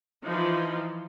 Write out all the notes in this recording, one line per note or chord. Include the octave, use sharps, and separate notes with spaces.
E3 F3 D#4 F4